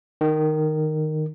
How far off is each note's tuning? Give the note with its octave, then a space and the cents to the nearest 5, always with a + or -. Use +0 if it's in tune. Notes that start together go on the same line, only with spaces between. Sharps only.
D#3 -10